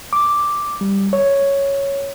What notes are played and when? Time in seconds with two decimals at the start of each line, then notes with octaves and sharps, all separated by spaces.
0.13 D6
0.81 G3
1.13 C#5